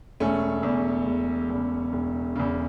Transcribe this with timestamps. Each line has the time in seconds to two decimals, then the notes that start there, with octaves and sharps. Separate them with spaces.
0.20 E1 A3 C#4
0.63 E2 C#3
1.06 E1
1.50 E2 C#3
1.93 E1
2.36 E2 C#3